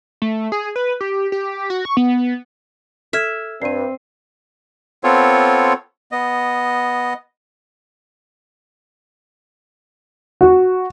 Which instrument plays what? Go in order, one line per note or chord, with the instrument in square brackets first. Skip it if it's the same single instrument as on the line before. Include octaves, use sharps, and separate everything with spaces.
[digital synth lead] A3
G#4
B4
G4
G4
F#4
C#6
B3
[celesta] A4 F6 G#6 [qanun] E5
[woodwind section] G2 [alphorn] C4 [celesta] C7 D#7
[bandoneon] B3 C4 F4 A4 C#5
B3 D#5
[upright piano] F#4